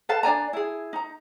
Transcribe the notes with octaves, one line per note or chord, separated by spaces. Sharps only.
A4 B4 F5 A5
D4 D5 G#5 A#5
E4 G#4
D#4 A#5